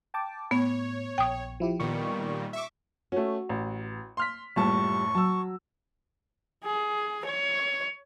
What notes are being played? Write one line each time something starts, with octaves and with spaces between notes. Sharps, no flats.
G5 A5 D6
A2 B3 C#5
A#1 G5 D#6
F3 E4 G4
A#2 D#3 G3 B3 C#6
E5 C#6 D6
A3 C#4 F#4
A1
C6 F6 B6
F#1 A2 G3 F4 E5 A5 C#6
F#3 A5 E6
G#4
C#5